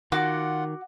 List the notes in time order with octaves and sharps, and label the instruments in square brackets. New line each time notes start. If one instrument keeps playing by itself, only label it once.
[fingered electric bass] D#3 [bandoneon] F4 F#5 [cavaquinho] F#4 D6